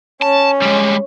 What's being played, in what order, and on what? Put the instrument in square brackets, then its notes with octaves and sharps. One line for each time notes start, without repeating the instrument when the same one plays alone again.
[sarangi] C#4 [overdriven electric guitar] A5
[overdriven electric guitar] G3 G#3